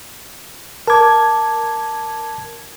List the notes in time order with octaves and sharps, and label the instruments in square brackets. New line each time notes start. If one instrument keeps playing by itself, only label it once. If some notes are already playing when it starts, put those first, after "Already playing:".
[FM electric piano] A#4 G#6 [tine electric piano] A5 D6